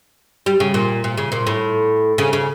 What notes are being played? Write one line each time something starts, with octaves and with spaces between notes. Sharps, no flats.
G3
C#3
A#2
A#2
C#3
A#2
A2
C#3
C#3